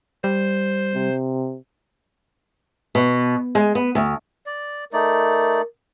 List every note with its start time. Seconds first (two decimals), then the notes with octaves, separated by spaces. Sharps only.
0.24 G3 C5
0.94 C3
2.95 B2
3.55 G#3
3.75 B3
3.95 D2
4.46 D5
4.93 A3 D#4 A#4 D5